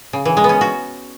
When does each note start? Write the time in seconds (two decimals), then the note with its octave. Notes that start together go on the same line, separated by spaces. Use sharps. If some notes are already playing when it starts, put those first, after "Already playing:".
0.13 C#3
0.25 E3
0.37 G#3
0.44 B3
0.49 C#4
0.61 F#4